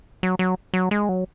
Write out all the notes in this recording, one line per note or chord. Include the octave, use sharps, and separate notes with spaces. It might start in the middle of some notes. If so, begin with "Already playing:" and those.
F#3
F#3
F#3
G#3
F#3